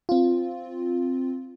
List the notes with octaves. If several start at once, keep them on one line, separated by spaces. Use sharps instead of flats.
C4 F4